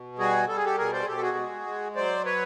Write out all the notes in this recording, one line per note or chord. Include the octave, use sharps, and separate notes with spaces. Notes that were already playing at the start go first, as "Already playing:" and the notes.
Already playing: B2
G3 F#4 G#4
G3 A4
G#4
G4 A4
B2 G#4 A#4
C5 D5
G#4
B2 G4 A4
A4
F#4 G#4
G#3
G#3
F#3 C5 D5
B4 C#5